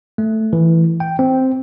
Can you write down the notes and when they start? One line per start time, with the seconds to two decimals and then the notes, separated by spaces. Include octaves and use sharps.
0.18 A3
0.53 E3
1.00 G5
1.19 C4